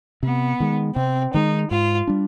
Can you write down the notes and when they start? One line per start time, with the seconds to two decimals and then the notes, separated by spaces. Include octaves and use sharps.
0.23 C3 B3
0.60 D#3 G#3
0.96 C3 C4
1.34 D#3 G#3 D#4
1.71 G#2 F4
2.07 G3 D4